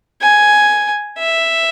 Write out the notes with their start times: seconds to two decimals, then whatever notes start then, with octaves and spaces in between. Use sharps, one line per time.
0.22 G#5
1.18 E5